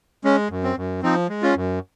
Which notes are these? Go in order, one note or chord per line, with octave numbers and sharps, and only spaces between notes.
G#3 C#4
F#2
C4
F#2
F3 C4 D#4
G#3
C#4 F4
F#2